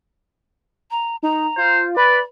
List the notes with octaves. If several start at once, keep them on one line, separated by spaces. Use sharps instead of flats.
A#5
D#4 A#5
F4 C5
B4 D5 B5